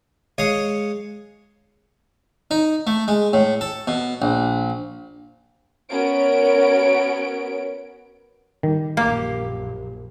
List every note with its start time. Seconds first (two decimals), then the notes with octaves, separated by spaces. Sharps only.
0.38 G#3 C#5 D#5 F5 D#6
2.51 D#4
2.87 A3
3.08 G#3
3.33 A2
3.61 A4
3.88 B2
4.22 A#1
5.89 B3 C#4 F#4 A#4 C#5 D7
8.63 D#3 G3
8.97 A#1 F#2 A#3 G4 F5